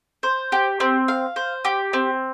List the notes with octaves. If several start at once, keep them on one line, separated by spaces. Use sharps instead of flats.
C5
G4
C4
F5
C5
G4
C4